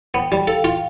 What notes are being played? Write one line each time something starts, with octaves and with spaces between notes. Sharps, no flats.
B3 G5
G3
A4 F5
F4